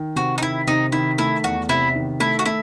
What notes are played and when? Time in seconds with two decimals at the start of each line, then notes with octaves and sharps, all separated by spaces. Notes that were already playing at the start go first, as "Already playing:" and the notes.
Already playing: D#3
0.16 C3 F#4
0.38 D#4
0.42 D#3 E4
0.67 C3 D#4
0.92 D#3 E4
1.18 A3 E4
1.44 E2 F#4
1.69 C3 E4
1.95 D#3
2.20 A3 E4
2.39 F#4
2.46 A3 E4